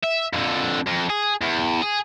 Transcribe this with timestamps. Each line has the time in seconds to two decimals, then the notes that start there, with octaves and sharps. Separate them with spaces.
0.04 E5
0.33 F2 D3
0.86 F2
1.10 G#4
1.42 E2
1.82 G#4